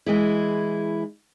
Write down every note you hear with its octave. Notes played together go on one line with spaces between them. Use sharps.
E3 G#3 E4